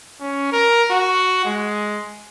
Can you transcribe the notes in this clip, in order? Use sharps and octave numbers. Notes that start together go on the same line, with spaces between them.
C#4
A#4
F#4
G#3